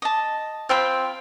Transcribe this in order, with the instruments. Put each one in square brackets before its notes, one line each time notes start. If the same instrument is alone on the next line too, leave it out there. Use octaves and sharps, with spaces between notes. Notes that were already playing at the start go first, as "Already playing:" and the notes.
[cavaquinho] D#5 A5
[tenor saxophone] C4 [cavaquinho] F4 G5 B5